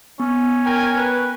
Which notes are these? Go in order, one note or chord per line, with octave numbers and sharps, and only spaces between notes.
B3 C#4
A#4 G5 G#5
B4